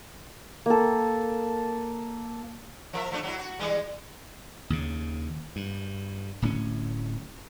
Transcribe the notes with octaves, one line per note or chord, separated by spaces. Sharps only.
A#3 A4
F3 A#4 E5
F3 A3 D4
F#3 E4
F#4
E3 G3 G#3
D#2 C#3
G2
D1 A2 A#3 C#4